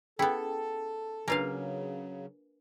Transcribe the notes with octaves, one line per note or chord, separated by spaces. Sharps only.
B3 C#4 E4 G#4 A4 G5
C#3 F#3 A#3 D4 F4 B4 F5 G#5